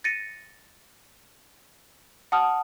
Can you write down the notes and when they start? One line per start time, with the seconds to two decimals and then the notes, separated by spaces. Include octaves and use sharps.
0.04 A6 A#6 C#7 D#7
2.32 F#5 A5 D#6 F6